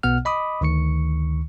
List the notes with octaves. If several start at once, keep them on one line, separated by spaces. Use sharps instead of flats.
B1 B2 B3 F#5 F6
D#5 B5 D6 D#6
D2 D#3 C#6 C#7